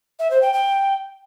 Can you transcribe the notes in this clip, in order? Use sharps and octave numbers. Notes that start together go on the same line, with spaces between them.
E5
C5
G5
G5